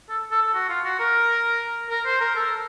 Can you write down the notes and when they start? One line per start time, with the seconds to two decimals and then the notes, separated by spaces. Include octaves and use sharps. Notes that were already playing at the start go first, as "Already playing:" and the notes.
0.09 A4
0.31 A4
0.42 A4
0.54 F#4
0.69 F4
0.84 F#4
0.99 A#4
1.90 A#4
2.06 C5
2.21 A#4
2.36 A4